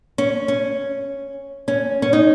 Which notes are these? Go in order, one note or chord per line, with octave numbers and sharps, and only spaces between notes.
C#4
C#4
C#4
C#4
D#4